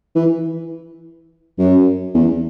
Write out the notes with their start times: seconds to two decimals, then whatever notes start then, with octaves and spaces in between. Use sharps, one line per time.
0.16 E3
1.58 F#2
2.15 E2